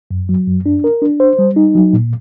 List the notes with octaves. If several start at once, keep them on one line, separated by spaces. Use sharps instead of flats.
F#2
F#3
F#2
D4
A#4
D4
C5
G3
D#4
F#3
A#2